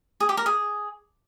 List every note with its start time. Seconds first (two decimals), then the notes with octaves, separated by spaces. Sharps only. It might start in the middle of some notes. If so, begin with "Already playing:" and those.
0.20 G#4
0.29 G4
0.37 A#4
0.46 G#4